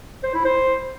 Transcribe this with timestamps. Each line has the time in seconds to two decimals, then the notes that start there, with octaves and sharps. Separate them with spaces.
0.24 C5
0.34 E4
0.45 C5